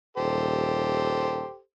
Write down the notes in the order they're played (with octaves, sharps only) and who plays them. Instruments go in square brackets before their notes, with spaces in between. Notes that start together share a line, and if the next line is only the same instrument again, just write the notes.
[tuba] D#1 [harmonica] G4 A4 C5